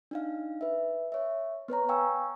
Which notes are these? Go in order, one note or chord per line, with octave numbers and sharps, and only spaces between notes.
D4 D#4 F5
B4 E5
C#5 E5
B3 B4 C#5 A#5
F5 G5 G#5 C#6 E6